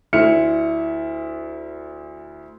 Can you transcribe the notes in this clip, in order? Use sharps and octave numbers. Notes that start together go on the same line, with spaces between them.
D2 E4 F6 C#7